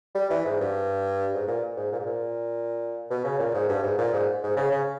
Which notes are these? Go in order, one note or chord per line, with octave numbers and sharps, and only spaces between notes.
G3
E3
G#2
G2
G#2
A#2
G#2
A#2
G#2
A#2
B2
C#3
A#2
G#2
G2
G#2
A#2
G#2
G#2
C#3
C#3